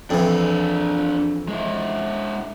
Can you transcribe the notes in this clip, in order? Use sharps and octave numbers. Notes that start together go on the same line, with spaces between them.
F2 E3 D4 G#4
G#3 E4